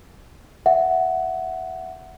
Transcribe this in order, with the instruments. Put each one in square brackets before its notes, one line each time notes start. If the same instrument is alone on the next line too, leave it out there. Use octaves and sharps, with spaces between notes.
[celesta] E5 F#5